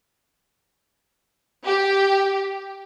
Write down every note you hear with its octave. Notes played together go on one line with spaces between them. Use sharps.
G4